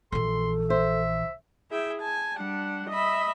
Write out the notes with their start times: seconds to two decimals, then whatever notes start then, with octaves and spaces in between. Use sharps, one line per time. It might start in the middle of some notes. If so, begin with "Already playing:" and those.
0.12 A#1 E3 A4 C6
0.70 C5 E5
1.70 E4 G#4 E5 G5
2.00 G#5 A5
2.36 G3 D4 F#5
2.89 D#5 E5 B5